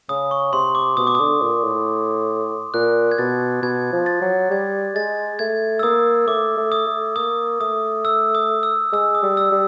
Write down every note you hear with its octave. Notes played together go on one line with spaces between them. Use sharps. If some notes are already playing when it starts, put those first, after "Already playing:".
C#3 D#6
C#6
C3 C6
D6
B2 D#6
D6
D3 D#6
A#2
A2
A#2 F#6
G#6
B2 A6
B2 G#6
F3
A6
F#3
G3 G#6
G#3 A6
A3 G#6
E6
A#3 D#6
A3 D6
A3
D#6
A3
A#3 D#6
A3 D#6
E6
D#6
E6
G#3 E6
D#6
G3
E6
G3